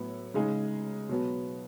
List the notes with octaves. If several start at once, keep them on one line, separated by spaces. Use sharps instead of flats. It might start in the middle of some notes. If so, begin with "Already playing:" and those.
Already playing: A2 F#3 B3
C#3 G#3 D#4 G#4
B2 F#3 B3